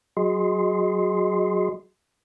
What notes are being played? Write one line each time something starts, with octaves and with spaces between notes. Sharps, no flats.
F#3 F#4 G#4 D#5 C6